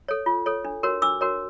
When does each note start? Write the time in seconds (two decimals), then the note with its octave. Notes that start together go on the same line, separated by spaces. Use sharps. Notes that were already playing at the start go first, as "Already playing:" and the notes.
0.08 A4 C#5
0.26 F4
0.46 A4 C#5
0.65 D4
0.83 F#4 A#4 C#5
1.02 D4 D6 E6
1.21 F#4 A#4 C#5